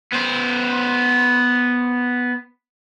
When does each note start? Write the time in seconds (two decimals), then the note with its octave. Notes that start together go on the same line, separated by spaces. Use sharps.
0.12 B3 C5